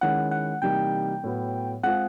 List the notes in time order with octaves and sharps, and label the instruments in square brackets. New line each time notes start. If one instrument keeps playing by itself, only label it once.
[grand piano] D#3 G#3 C#4 E4 [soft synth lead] F#5
[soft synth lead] F#5
[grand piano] C3 E3 G3 A#3 D#4 [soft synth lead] G5
[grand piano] A2 F#3 B3
[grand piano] G#3 C4 F4 G#4 [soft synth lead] F#5